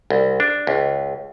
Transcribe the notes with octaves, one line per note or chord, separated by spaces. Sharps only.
C2
D4
C#2